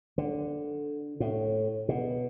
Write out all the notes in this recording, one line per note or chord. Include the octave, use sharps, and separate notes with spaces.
D3
A2
B2